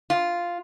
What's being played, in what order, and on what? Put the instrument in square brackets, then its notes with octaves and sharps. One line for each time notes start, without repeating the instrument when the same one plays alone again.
[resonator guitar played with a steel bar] F4